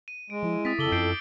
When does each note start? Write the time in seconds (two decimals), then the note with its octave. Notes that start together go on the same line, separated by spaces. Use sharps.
0.08 D#7
0.30 G#3 D7
0.43 F3 E4
0.65 C4 D#6 A6 B6
0.79 F2 C#3 A4 D6 F#7 G7
0.92 F#2 G6 C7 D7